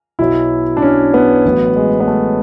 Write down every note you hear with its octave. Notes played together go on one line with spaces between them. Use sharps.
B1 B2 F#3 E4
D4
C#4
B3
A1 A2 F#3
G#3
B3
A3